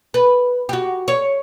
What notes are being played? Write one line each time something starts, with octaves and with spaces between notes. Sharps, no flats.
B4
F#4 G4
C#5